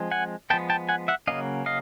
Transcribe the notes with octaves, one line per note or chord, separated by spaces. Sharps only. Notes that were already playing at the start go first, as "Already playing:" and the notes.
Already playing: F3 G#3 C4
F#5 G#5
F3 G#3 B3 G5 A5
G5 A5
F#5 G#5
E5 F#5
C#3 F#3 A#3 C#4 D#5 F5
D#5 F5